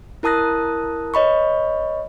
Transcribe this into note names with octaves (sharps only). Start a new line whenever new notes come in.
E4 A#4 A5 D#6 F#6 A#6
B4 C#5 D#5 B5 C#6